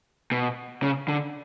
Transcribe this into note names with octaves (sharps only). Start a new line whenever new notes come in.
B2
C#3
D3